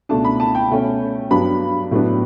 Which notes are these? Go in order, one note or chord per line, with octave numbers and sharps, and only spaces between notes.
C#2 B2 A3 D4 A5
B5
A5
G5
B2 A3 C#4
G2 F#3 B3 D4 B5
A2 F#3 B3 D4